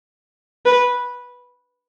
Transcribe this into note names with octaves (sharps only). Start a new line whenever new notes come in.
B4